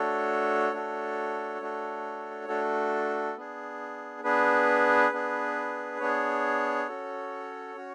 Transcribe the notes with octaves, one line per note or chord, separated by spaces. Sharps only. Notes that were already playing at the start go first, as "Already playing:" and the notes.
Already playing: A3 D4 F#4 A4 C#5
A3 D4 F#4 A4
A3 D4 F#4 A4
A3 D4 F#4 A4
B3 D4 G#4
B3 D4 G#4 B4
B3 D4 G#4
B3 D4 G#4 C#5
C#4 F#4 A4
C#4 F#4